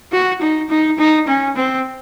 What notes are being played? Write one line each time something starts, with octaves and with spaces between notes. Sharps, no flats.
F#4
D#4
D#4
D#4
C#4
C4